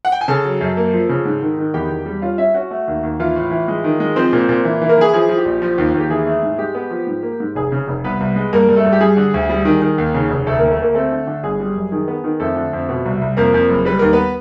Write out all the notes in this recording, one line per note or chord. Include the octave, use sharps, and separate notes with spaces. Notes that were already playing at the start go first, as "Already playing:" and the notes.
F#5
G5
G#5
C#3 A4 A5
F#3
F#2
A#3
F3
C#3
G#2
D#3
D#3
E2 G4 G5
E2
G3
C#4 F4 F5
C#4 E4 E5
C#4 F#4 F#5
A3
D#2
D#2
E3 F4 F5
A2
E3
G#3
D#3
G#3
F3 C4 C5
A#2
A#2
E3
E3
A#3 A#4
E3 G#4
F3 G#4
F3
G4
A#1
F3
D#2
D#2
G4
E3 G#4
A3
G#2
G#3 G4
B3
F3
G#2
A#3
G#2
F1 G#4
C#3
F1
C2 B3 B4
C2
G#3
G2 A#3 A#4
G2
A3 A4
G2
G4
G3 G#4
D3
D2
G3
D#3
D#3
D#2
C#3
F1
D2 A3 A4
D2 A#3 A#4
A3 A4
D2 A#3 A#4
A3 C4 A4
D3
D3
G1 G#4
G3
F#2
D#3 G#4
B3
D#3
F2 A3 A4
D3
F2
B2
C2
C2
F2 A#3 A#4
F2
F#1
G3 B4
D#2 A#4
B3 B4